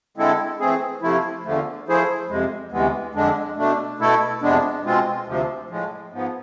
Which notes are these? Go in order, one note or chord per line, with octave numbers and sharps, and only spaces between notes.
D3 G#3 C4 E4 A4
E3 A3 C4 G#4
C3 F3 A3 E4
E2 D3 F3 A3
F3 A3 E4 G#4 C5
F2 C3 G#3
D2 C3 E3 G#3 B3
F2 D3 G#3 D4
B2 A3 D4
B2 A3 E4 A4
F2 C3 G#3 B3 D4
B2 G#3 C4 F4
D2 C3 F3
A2 F3 G#3
G#2 F3 B3